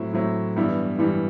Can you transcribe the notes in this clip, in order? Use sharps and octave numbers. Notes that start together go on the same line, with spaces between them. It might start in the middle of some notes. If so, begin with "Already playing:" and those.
Already playing: A2 F#3 C4 E4
A2 F#3 C4 E4
G2 E3 G3 B3 E4
G2 E3 G3 B3 E4